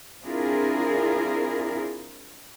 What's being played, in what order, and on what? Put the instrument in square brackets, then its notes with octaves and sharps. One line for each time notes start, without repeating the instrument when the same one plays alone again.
[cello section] C4 D4 E4 F4 G#4 A#4